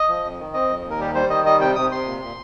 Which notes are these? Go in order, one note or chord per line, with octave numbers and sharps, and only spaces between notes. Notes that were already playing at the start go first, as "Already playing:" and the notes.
Already playing: D#5
F3
F2
D#3
C4 D#5
F2
D#2
A#4
G3 G4
G3 C5
D#3 D#5
G3 D#5
C3 G5
C3 D#6
C3 C6
A#2
A#2